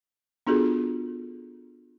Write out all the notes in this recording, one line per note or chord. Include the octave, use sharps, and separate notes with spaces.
B3 D4 F4 F#4 G#4 A4